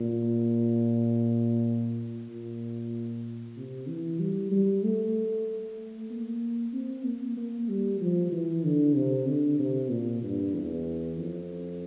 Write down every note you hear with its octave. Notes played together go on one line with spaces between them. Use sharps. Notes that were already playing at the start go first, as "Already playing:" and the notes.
Already playing: A#2
A#2
C3
E3
G3
G3
A3
A#3
C4
A#3
A#3
G3
F3
E3
D3
C3
D3
C3
A#2
G2
E2
F2